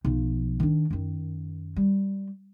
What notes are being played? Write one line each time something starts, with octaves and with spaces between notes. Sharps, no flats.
B1 F3
D#3 D4
F#2 D#3
G3